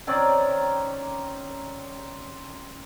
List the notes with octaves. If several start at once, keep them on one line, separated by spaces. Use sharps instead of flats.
D#3 C4 C#4 D5